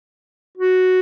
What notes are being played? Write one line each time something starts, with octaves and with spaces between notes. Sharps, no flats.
F#4